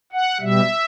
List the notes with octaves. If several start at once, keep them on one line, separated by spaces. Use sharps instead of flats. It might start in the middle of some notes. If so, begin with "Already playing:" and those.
F#5
B2 G3 E5